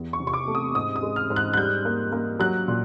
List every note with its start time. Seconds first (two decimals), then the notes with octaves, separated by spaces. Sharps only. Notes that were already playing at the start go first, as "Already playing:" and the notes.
Already playing: E2
0.13 C#6
0.20 C3
0.27 C#6
0.34 D6
0.48 A3
0.55 D#6
0.75 G#2 D#6
0.96 D#6
1.03 G#3
1.16 F6
1.30 G#2
1.36 F#6
1.54 F#6
1.57 G3 G6
1.85 A#3
2.12 A#3
2.39 F#3 F#6
2.68 A#2